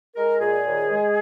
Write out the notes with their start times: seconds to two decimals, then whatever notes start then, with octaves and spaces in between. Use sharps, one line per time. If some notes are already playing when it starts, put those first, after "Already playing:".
0.15 G#3 A#4
0.39 A#2 G#4
0.64 D#2
0.89 G#3